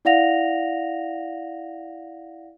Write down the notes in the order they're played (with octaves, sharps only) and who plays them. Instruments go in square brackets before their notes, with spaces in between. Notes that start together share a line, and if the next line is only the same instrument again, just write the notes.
[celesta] E4 D5 F5 F#5 A#6 F7